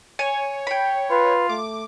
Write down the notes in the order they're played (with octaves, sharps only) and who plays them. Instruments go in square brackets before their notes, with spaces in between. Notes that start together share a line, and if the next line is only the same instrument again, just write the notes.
[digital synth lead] C#5 [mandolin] G#5
[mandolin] G5 B5
[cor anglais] F4 [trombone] B4
[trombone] A3 [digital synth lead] D6